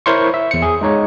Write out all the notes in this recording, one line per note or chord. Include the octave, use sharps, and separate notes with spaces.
E4 A#4 C5 C#5 C6 C#6
E5
E2 C#7
G#4
G#3 D#4 C#5